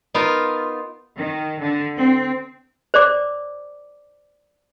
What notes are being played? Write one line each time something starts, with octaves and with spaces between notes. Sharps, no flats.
B3 D#4 F4 A#4
D#3
D3
C4
C5 D5 D6